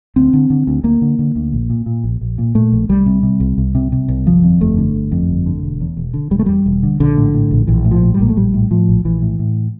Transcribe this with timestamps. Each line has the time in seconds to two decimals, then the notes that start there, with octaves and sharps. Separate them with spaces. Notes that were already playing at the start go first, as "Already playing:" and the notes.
0.16 D2 C4
0.33 D3
0.50 D3
0.67 D2
0.84 D2 A#3
1.01 D3
1.19 D3
1.36 D2
1.53 A#1
1.70 A#2
1.86 A#2
2.04 A#1
2.21 A#1
2.38 A#2
2.55 A#2 A3
2.72 A#1
2.89 C2 G3
3.06 C3
3.23 C3
3.40 C2
3.58 C2
3.75 C3
3.92 C3
4.08 C2
4.26 G1 F3
4.43 F2
4.60 G1 A3
4.77 D3
4.95 G1
5.12 F2
5.29 G1
5.46 D3
5.63 E1
5.81 E2
5.97 E1
6.14 D3
6.31 E1 G3
6.39 A3
6.46 E2 G3
6.66 E1
6.83 D3
7.00 A#1 D3
7.17 A2
7.34 A2
7.51 A#1
7.67 A#1 E3
7.85 A2
7.91 F3
8.02 A2
8.14 G3
8.20 A#1 A#3
8.29 A3
8.37 A#1 G3
8.54 A2
8.71 A2 F3
8.88 A#1
9.05 A#1 E3
9.22 A2
9.39 A2